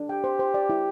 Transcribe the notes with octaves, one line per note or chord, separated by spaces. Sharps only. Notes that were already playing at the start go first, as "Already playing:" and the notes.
Already playing: D4
G4 G5
C5
C5
D5
E4